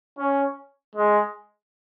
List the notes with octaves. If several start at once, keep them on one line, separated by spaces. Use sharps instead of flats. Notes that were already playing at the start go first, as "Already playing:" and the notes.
C#4
G#3